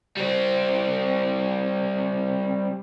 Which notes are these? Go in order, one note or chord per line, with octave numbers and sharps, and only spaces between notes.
G3 C4